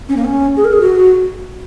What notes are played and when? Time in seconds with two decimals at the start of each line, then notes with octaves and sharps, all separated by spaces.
0.09 C#4
0.17 A#3
0.25 C#4
0.57 G#4
0.65 A#4
0.73 G#4
0.81 F#4